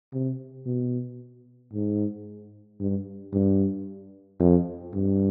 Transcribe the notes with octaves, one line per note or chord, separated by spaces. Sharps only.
C3
B2
G#2
G2
G2
F2
G2